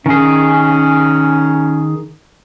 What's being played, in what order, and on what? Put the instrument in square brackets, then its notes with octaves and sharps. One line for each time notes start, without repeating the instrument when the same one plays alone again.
[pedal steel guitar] D#3 G#4 [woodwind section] C#4